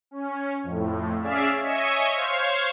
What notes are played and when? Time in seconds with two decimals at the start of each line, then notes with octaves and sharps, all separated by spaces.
0.11 C#4
0.63 F2 A2
1.21 C#4 G#4 D5 E5 F5
1.60 C#5 D#5 E5 G#5 C#6
2.14 C5 C#5 F5 G#6